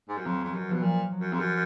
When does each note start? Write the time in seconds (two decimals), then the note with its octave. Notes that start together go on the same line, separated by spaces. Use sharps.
0.09 G#2
0.17 F#2
0.25 F2 F#3
0.40 F2 G#3
0.54 F#2 F#3
0.69 B2 F3
0.82 A#2 F3
1.12 F#3
1.21 F#2
1.33 F2
1.40 F#2 F3